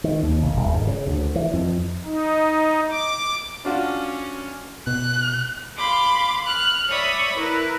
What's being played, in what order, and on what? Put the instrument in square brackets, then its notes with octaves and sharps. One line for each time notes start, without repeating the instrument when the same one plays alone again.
[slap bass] D#3
D#2
B1
D#1
G#2
C#3
D2
E3
F2
[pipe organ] D#4
D6
[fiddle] C#4 [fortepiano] D4 F4 F#4
[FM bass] B2 [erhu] F#6
[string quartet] F5 B5 C6 D6
F6 F#6
C#5 D5 E5 B5 D#6
E4 A#4 B4